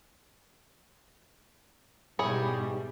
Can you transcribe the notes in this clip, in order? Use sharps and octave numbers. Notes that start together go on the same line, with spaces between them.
G#2 B2 G3 E4 G#4 C#5